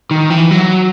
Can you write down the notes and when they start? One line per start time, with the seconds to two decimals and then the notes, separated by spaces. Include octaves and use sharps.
0.11 D#3
0.30 E3
0.51 F#3